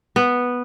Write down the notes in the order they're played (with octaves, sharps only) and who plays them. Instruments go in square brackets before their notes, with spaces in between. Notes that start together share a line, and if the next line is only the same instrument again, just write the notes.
[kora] B3